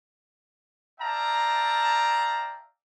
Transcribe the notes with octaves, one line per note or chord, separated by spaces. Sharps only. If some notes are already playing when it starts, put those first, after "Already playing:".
D5 E5 F5 G5 A5 A#5